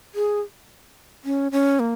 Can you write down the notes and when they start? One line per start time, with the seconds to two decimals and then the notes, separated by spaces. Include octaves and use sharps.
0.15 G#4
1.25 C#4
1.52 C#4
1.80 A#3